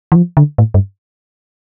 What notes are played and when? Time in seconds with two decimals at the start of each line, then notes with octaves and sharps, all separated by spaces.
0.12 E3
0.16 F3
0.37 D3
0.58 A2
0.74 G2